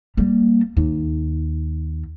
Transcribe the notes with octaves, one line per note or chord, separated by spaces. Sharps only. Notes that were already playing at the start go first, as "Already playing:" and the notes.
G3 A#3
D#2